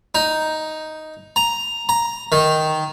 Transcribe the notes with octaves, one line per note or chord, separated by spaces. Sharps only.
D#4
A#5
A#5
D#3